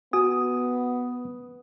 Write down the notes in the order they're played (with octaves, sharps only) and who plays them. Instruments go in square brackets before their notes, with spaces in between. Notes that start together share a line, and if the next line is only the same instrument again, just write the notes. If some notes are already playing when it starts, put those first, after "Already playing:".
[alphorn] B3 [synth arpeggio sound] F#4 G#5 [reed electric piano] D#6